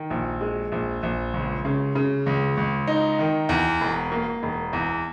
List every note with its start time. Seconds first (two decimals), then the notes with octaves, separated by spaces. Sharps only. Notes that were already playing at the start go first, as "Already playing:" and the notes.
Already playing: D#3
0.10 A#1
0.41 G#3
0.72 A#1
1.03 A#1
1.34 C#2
1.65 C#3
1.95 C#3
2.26 C#2
2.57 C#2
2.87 D#4
3.19 D#3
3.49 E2
3.81 E1
4.12 A#3
4.43 E1
4.73 E2